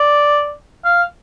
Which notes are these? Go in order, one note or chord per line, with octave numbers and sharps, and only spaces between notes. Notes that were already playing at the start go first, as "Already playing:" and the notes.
Already playing: D5
F5